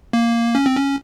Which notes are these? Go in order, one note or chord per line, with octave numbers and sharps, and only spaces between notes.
A#3
C#4
C4
C#4